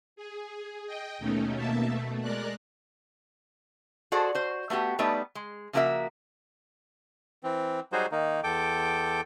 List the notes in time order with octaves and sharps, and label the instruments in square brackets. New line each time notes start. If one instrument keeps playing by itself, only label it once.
[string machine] G#4
D#5 G5
D#2 B2 A3 C#4 D#4
B2 A#3 E5 A5
B2 A3
G#3 A#4 D5 F#6
[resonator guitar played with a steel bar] F#4 G#4 A4 C5 D5
F#4 C5
A3 B3 F#4 G4
G3 A3 B3 D#4 B4 D5
G#3
C#3 F3 A#3 F#4 A#4 E5
[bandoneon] E3 C4
F#3 G3 D#4 F#4 G#4 C5
D#3 A#3 D#4
E2 A4 G5 D6